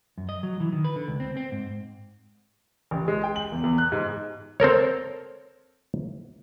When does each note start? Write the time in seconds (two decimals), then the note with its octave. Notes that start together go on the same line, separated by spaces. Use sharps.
0.18 F#2
0.29 D#5
0.43 F#3
0.60 E3
0.72 D#3
0.84 B4
0.96 D3
1.08 C#2
1.20 C4
1.37 C4
1.52 G#2
2.91 A1
3.08 G#3
3.23 G5
3.36 F#7
3.52 E2
3.64 E2
3.78 F#6
3.92 G#2
4.60 C4 A4 A#4 C#5